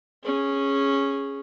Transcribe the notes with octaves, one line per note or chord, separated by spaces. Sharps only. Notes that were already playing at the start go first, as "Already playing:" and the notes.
C#4 G#4